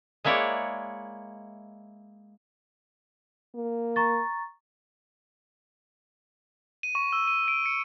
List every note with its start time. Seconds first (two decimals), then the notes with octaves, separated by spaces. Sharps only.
0.24 G#3 A#3 E4 C#5 D5 F#5
3.55 A#3
3.96 A#5 C#6 A6
6.83 D#7
6.95 C#6
7.13 E6
7.28 D#7
7.48 D7
7.66 C#7